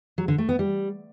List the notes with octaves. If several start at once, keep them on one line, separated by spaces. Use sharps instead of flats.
F#3
D3
A3
B3
G3